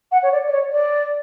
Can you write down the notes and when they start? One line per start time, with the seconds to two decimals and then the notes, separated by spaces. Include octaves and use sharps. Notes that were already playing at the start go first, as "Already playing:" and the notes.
0.11 F#5
0.22 C#5
0.31 D5
0.47 D5
0.52 C#5
0.72 D5